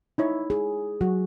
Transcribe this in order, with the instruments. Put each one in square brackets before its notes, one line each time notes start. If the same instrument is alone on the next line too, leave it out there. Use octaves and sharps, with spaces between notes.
[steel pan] D#4 E4 C#5
[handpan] G#4
[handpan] F#3 [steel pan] F#4